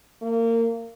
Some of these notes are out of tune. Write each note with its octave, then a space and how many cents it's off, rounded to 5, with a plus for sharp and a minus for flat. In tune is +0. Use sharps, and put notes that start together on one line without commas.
A#3 -25